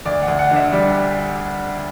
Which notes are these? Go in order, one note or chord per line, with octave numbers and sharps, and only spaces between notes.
D2 D5
F#5
D2
F#5
D3
E5
G3 D5